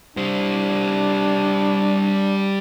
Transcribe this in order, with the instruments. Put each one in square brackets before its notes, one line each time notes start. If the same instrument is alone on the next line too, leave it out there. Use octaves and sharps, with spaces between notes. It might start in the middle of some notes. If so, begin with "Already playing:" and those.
[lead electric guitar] G3 C5 [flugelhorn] D4